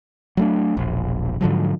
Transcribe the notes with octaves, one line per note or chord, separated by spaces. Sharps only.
F#3 A3 D4
E1 A#1
G#2 D3 F3 F#3